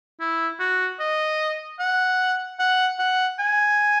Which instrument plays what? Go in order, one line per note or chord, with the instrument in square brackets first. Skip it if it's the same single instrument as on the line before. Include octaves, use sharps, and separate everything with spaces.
[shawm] E4
F#4
D#5
F#5
F#5
F#5
G#5